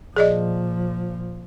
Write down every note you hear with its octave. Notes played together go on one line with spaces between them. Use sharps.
A#2 F3 G#4 D5 D#5